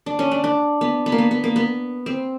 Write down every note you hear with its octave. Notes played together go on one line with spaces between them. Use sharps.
D4
C#4
D4
D4
B3
B3
A#3
B3
B3
A#3
B3
C4